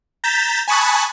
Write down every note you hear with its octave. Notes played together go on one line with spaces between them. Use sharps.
A#5 G6 A6 B6 E7
G#5 A5 B5 C#6 D#6 F#6